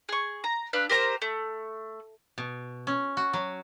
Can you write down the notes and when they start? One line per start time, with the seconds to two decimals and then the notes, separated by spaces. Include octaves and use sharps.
0.09 G#4 C#6
0.44 A#5
0.73 D4 B4 F5 E6
0.89 G4 A#4 C5 A#5
1.22 A3
2.38 B2
2.87 C#4
3.17 F#4
3.33 F#3